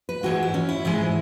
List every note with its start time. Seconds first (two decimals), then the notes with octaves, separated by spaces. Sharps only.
0.09 B4
0.23 G#2 E3 G#3 F#4
0.43 E4
0.54 C#4
0.69 E4
0.85 G#2 E3 G#3